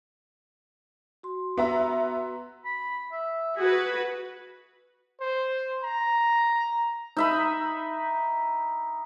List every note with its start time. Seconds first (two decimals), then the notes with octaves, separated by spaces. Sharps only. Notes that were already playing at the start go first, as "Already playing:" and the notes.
1.23 F#4 C6
1.57 B3 E5 A#5
2.65 B5
3.12 E5
3.57 F#4 G#4 B4
5.21 C5
5.83 A#5
7.17 D#4 E5 B5